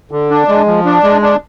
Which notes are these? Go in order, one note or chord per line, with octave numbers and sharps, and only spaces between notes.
D3
D4
G#3
F3
D4
G#3
D4